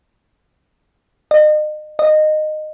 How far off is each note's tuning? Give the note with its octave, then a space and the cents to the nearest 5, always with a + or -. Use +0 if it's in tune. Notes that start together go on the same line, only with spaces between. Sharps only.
D#5 -35
D#5 -15